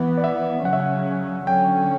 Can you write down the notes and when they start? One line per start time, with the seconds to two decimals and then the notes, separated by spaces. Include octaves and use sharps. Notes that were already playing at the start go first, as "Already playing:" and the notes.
Already playing: E3 B3
0.18 D5
0.24 E5
0.65 C#3 F#3 C#4 F#5
0.73 E5
0.80 F#5
1.46 D3 F#3 C#4 G5